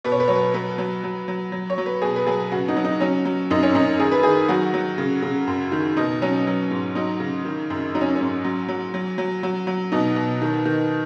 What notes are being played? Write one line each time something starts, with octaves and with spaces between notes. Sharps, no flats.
B2 B4
C#5
B4
F#3 C#5
B4
F#3 B4
F#3
F#3
F#3
F#3
C#5
F#3
B4
B2 G#4
B4
F#3 G#4
C#3 F#4
D#4
F#3
D#4
F#3 C#4
F#3
F#2 D#4
C#4
F#2 D#4
D#3 G#4
B4
D#3 G#4
F#3 F#4
F#3
C#3
C#3
F#2
D#3
B2 D#4
F#3 C#4
F#3
G#2
F#3 D#4
C#3
D#3
F#2
F#3 D#4
C#4
G#2 C#4
F#3
F#3
F#3
F#3
F#3
F#3
B2 D#4
B2
D#3
D#3